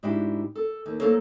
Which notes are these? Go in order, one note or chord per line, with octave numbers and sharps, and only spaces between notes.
G#2 D4 E4 F#4 G4
A4
D#2
F#3 G#3 A#3 A4 C5 C#5